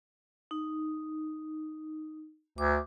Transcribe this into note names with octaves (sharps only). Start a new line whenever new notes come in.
D#4
D2 D6